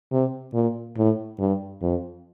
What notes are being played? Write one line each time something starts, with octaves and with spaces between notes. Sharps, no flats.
C3
A#2
A2
G2
F2